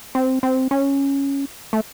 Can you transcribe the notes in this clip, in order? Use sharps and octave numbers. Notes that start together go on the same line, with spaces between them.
C4
C4
C#4
A3